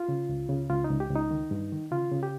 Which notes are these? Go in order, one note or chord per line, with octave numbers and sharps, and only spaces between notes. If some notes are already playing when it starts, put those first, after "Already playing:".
Already playing: F4
C#3
C#2
C#3
C#2 F4
D#4
C#2
G4
C#2 D#4
D#3
G2
D#3
C#3 F4
C#3
G4